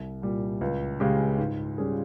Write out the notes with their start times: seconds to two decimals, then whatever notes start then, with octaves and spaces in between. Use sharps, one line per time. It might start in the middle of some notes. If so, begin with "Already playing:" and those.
Already playing: C2
0.22 A#2 G3
0.61 C#2
1.00 C#3 G#3 C#4 G4
1.38 G#2
1.78 G3 C#4 F4 G#4